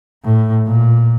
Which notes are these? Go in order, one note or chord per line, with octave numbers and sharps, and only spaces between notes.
A2
A#2